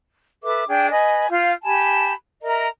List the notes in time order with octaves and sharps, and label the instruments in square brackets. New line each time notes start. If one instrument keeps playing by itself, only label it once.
[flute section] A4 B4 E5 D6
D4 G#4 G5
B4 D#5 G#5
F4 F5 F6 G6
G4 G#5 A5 B5
A#4 D#5 E5 A#5